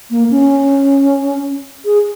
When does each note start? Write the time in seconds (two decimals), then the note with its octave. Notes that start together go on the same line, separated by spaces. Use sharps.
0.11 A#3
0.31 C#4
1.85 G#4